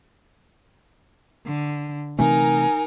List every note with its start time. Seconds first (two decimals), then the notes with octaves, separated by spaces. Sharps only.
1.46 D3
2.19 C3 E3 A3 D#4 A#4 G#5